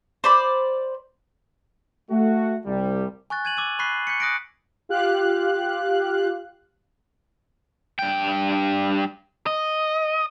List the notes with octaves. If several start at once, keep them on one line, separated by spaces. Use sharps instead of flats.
C5 D5 B5
A3 F#4
C2 G3
G#5 C#6 F#6 A6
G#6 D#7 F#7
D6 E6 D#7
B5 C#6 F#6 A6 B6 C7
C#6 G6 B6 C#7
D#6 F#6 A#6 B6 D7
F4 G4 F5 F#6
G2 G5
D#5